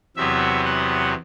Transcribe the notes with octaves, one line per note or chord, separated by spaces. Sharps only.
E2 C3 F#3 B3 E5
F#5